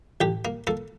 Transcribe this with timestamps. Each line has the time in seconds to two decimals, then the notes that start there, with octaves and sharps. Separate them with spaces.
0.21 A1 G4
0.45 A#3
0.67 A#3 A4